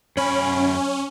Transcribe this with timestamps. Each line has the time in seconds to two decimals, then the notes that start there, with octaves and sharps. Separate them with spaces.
0.17 F#2 C#4 B5